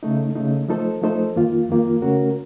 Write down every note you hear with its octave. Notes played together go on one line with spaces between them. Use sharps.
C#3 A3 D#4
C#3 A3 D#4
F3 A3 D#4 A4 C5
F3 A3 D#4 A4 C5
F2 D#3 A#3 F4
F2 D#3 A#3 F4
C#3 A3 C#4 F#4 A#4